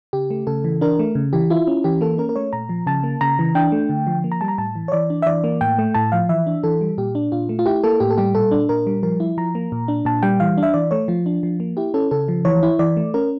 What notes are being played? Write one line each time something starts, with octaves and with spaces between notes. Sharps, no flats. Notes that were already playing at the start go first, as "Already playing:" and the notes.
C#3 G4
A3
C#3 A4
E3
D4 A#4
A3
C#3
E3 G4
E4 F4
C#4
E3 G4
A#3 A4
C#4 A#4
A#4
A3 C#5
A#2 A#5
F3
C#3 A5
A#3
C#3 A#5
E3
D4 G5
A3
D3
F3
A#3
A#5
G3 A5
A#5
A2 A5
E3
C#5
E3 D5
D4
E5
E3 D5
A#3
A2 G5
A3
A2 A5
F3 F5
E3 E5
D4
E3 A4
G3
A#2 G4
D4
A#2 F4
A3
F4
E4 G4
A#3 A4
A2 G4
A4
G3 G4
A#2 A4
D4
A#2 A#4
G3
F3 A#4
E4
F3 A#5
A#3
A#2
D4
A#2 A5
G3 G5
E3 F5
D4
E5
E3 D5
A3 C#5
F3 F4
D4
F3
A#3
E4 G4
C#4 A4
C#3 A4
F3
E3 C#5
E4
E3 D5
A3
C#4 A#4